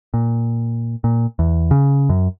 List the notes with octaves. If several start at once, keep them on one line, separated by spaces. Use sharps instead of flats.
A#2
A#2
E2
C#3
F#2